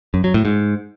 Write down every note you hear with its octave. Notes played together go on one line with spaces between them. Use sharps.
F#2
F#3
A2
G#2